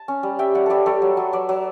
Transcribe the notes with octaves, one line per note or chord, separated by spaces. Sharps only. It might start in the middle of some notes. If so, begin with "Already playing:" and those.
Already playing: A5
C#4
G3
G3 E5 G5
G3 D5 F#5
G3 G4 A4 B4
G3 A4 C#5
F#3
F#3
F#3 B4 D5
F#3